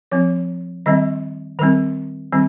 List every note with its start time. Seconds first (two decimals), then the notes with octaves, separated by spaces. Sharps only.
0.12 F3 C4 C#5
0.86 D#3 G3 C4 D#5
1.59 D#3 G3 C4 A#4
2.32 D#3 G3 C4